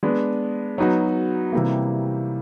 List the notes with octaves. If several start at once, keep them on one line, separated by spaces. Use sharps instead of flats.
G#3 B3 D4
F#3 B3 D#4 F#4
C3 E3 G3 A#3